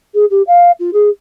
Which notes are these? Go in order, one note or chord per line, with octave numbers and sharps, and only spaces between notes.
G#4
G4
F5
F4
G#4